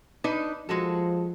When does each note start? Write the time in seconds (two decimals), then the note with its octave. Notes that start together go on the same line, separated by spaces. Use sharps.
0.24 D4 D#4 B4
0.69 F3 G#3 F#4 A4